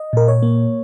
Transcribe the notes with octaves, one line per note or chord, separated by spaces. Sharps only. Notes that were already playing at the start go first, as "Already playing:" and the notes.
Already playing: D#5
A#2 A#4
C#5
A#3